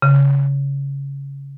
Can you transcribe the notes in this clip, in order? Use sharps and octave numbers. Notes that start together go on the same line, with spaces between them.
C#3